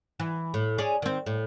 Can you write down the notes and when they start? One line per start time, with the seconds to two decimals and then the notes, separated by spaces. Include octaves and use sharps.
0.20 E3
0.54 A2
0.78 C#4 G#4 D5
1.02 D#3 C4
1.26 A2